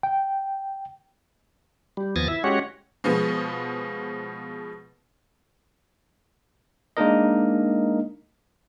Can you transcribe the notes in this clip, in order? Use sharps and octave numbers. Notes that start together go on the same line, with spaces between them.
G5
G3
D#2 F3 B3 G#5 A6 A#6
E4 E5
G#3 C#4 F#4 G4 C#5 F#5
B2 F3 G#3 B3
G#3 A#3 D4 D#4 A#4 D#5